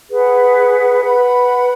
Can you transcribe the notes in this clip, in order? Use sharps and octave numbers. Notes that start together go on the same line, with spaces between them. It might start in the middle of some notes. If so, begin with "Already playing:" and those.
G#4 B4 F#5
B4 F#5 B5